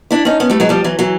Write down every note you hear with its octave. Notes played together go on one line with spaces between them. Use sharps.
D4 E4
C#4 D#4
B3 C#4
G3 A3
F#3 G#3
F3 G3
E3 F#3
E3 F#3